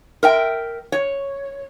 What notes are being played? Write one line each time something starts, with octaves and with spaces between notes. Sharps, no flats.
A#4 E5 G5
C#5